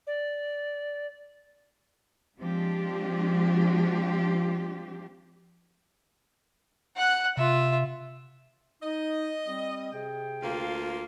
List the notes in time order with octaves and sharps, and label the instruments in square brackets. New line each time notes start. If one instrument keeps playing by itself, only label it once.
[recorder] D5
[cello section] F3 G#3 C4 D4 F4 G4
[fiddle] F#5 F#6
[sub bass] C3 [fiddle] F4 E5
[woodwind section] D#4 [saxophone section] D#5
[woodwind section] G3 C4
C3 G#4 G5
[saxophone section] D2 A#3 F4